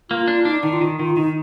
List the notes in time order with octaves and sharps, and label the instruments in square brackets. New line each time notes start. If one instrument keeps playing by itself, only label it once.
[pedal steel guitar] A#3 [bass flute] F4
[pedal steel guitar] D4 [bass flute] F4
[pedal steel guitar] D4 [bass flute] D#4
[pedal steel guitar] D#3 [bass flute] D#4
[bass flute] F4
[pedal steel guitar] D#3 [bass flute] D#4
[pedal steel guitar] D#3 [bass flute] F4
[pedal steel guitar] D#3 [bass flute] D#4